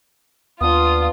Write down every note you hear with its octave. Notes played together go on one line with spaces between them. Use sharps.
D#2 B3 D4 F4 D#6